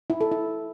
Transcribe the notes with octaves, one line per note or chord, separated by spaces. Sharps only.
E4
A4
E4